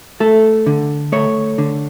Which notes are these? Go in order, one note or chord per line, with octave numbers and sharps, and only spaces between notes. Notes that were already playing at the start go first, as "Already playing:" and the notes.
A3 A4
D3
A3 C#5
D3